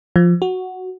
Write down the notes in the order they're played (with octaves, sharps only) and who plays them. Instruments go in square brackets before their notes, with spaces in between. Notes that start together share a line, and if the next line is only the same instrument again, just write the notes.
[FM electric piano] F3
F#4